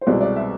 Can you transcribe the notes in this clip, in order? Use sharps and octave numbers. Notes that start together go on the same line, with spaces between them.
C5
C2 B2 G#3 C4 D5
D5
E5